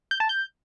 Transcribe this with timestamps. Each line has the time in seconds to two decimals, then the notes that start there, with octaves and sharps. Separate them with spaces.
0.11 G6
0.20 A5
0.29 G6